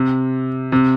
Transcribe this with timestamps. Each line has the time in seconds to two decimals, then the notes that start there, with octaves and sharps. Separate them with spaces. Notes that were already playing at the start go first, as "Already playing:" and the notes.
Already playing: C3
0.72 C3